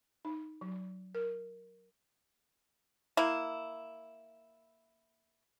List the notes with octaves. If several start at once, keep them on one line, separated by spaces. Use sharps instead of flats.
D#4
F#3
A#4
A#3 E4